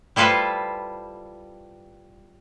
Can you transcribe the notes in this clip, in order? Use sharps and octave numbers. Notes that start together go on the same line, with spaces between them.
G3 E4 F4 A4 B4 C5